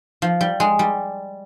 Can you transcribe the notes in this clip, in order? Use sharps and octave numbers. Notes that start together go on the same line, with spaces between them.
F3
G3
G#3
G3